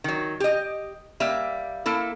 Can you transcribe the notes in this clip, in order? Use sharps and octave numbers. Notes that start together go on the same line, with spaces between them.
D#3 F#3
G4 D#5
G3 A#3 E5
A#3 E4 A4